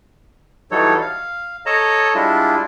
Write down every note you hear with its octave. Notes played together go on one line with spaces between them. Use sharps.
E3 F#3 G3 D#4 A4 C#5
F5
A4 C#5 D#5 A5 A#5
G3 G#3 D4 E4 F4